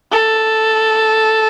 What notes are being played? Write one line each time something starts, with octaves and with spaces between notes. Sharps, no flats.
A4